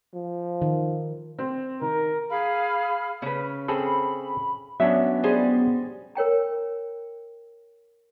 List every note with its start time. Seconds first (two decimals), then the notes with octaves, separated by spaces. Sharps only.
0.15 F3
0.62 D#3
1.39 C4
1.81 D#3 A#4
2.30 G#4 F5 B5 F6
3.22 C#3 C#4 B4
3.68 C4 G#4 A4 B5
4.80 F#3 B3 C#4 D4 E5
5.24 G3 G#3 G#4 C5
6.15 A#4 C#5 G5 A#5